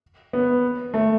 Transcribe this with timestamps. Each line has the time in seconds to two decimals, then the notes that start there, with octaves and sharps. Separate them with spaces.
0.33 B3
0.94 A3